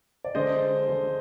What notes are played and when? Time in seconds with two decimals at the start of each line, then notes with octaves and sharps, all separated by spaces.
0.25 D5
0.35 D3 G#3 C5 D#5
0.88 D3 G#3